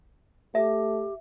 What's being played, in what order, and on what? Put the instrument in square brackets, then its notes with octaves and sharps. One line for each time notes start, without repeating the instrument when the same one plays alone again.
[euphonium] A3 [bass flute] G4 [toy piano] E5